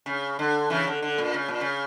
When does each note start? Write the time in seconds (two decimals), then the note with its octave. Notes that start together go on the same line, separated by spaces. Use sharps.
0.06 C#3
0.39 D3
0.70 C#3 E3
0.87 D3
1.02 D3
1.18 A#2
1.34 C#3
1.48 A#2
1.61 C#3